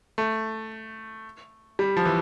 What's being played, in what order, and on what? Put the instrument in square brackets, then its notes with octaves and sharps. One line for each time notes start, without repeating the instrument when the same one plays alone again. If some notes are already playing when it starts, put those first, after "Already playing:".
[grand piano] A3
G3
F3
E3